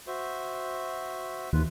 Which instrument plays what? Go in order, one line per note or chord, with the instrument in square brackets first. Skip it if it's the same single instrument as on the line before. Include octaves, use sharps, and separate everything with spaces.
[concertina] F#4 C5 E5
[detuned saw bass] D#2 [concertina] F4 B4